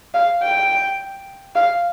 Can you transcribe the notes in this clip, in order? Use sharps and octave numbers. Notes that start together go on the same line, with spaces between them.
F5
G5
F5